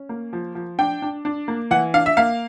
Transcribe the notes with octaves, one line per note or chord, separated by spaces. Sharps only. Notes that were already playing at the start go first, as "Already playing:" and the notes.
Already playing: C#4
A#3
F3
F3
D4 G5
D4
D4
A#3
E3 F#5
D4 F5
E5
A#3 F5